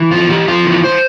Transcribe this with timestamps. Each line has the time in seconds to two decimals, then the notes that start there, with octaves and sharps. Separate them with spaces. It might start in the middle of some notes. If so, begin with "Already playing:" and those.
Already playing: E3
0.11 F2 F4
0.29 E3 G4
0.48 F2 F4
0.66 E3
0.84 C5